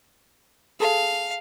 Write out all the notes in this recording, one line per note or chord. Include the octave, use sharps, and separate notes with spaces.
G#4 A4 F5 A5